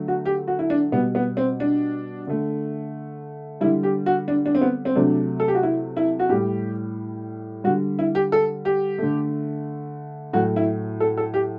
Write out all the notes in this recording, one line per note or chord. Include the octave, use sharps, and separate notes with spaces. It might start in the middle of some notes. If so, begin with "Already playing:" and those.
Already playing: D3 F#3 A3
F#4
G4
F#4
E4
D4
B2 G3 B3
B3
C4
D4
D3 A3
D3 G3 E4
G4
F#4
D4
D4
C4
B3
C4
C3 F#3 A3 D4
A4
G4
F#4
E4
E4
F#4
A2 G3 G4
D3 G3 F#4
E4
G4
A4
G4
D3 A3
A2 F#3 A3 F#4
E4
A4
A4
G4